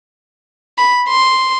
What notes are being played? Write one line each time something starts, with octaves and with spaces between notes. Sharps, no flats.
B5
C6